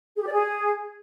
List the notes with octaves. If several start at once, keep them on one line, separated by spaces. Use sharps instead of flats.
G#4
G4
D5
G#4